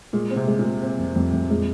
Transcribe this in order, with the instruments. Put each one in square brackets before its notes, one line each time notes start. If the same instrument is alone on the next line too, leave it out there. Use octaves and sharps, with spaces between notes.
[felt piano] A#2 [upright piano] G#3
[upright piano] C4
[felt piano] C3
[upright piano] G#3
[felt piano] A#2
[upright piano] G#3
C4
F2
F2
F2
[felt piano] A#2 [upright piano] G#3